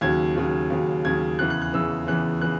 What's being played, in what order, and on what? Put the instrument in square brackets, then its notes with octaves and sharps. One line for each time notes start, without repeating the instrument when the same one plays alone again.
[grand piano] D#2 C#3 F#3 G#6
D#2 C#3 F#3
D#2 C#3 F#3
D#2 C#3 F#3 G#6
E2 C#3 E3 F#6
F#6
F#6
E2 C#3 E3 E6
E2 C#3 E3 F#6
C#3 E3 F#6